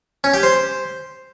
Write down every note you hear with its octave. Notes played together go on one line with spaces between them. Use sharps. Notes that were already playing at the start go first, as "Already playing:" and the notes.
C#4
G4
C5